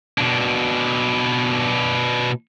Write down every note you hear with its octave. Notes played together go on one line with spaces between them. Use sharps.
B2 D4